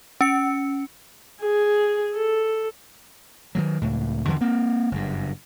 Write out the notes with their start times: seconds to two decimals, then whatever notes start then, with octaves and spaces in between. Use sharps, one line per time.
0.21 C#4 C#7
1.42 G#4
2.15 A4
3.55 D#3 F3 F#3
3.81 C#2 A2
4.28 E2 G2 D3 E3
4.41 A#3 C4
4.92 F#1 G2